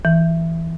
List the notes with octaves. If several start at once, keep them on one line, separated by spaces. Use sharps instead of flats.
E3